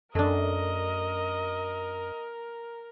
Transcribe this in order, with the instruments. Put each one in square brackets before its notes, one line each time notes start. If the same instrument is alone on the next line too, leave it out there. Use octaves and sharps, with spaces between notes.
[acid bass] F#2 [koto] A3 D4 [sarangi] A#4 [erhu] D#5